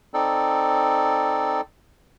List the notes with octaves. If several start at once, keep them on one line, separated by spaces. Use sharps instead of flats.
C4 D#4 A4 D5